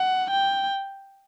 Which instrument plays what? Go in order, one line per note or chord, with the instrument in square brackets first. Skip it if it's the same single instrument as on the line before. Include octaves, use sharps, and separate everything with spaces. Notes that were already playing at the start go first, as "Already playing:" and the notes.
Already playing: [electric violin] F#5
G5